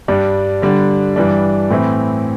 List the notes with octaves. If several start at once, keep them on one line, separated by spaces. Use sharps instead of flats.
G2 G3 D4
D3 G3 D4
G2 E3 G3 D4
A2 E3 C4 E4